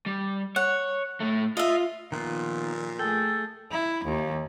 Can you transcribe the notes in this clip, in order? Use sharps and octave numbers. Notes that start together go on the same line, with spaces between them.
G3
C#5 F#5
A2 A3
F4 D#5 E5
A#2 D#3 F3 B3 F4
A3 G#4 A4 G5
E4
D#2